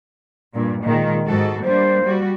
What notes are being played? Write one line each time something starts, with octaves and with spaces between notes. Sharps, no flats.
G2 A#2
A#2 D#3 G#3
G#2 F#4 A4
G3 A#3 D4 C5
G3 F#4